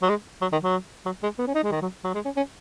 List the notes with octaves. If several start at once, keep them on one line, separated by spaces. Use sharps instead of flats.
F#3
G#3
F#3
D#3
F#3
F#3
G#3
B3
C#4
D#4
G#3
D#3
F#3
F#3
G#3
C#4
C#4